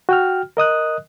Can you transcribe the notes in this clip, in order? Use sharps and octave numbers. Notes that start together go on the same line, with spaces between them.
F#4 G5 F6
A#4 D#5 D#6 F#6